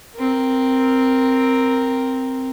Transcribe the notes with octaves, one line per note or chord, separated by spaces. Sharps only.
C4 A#4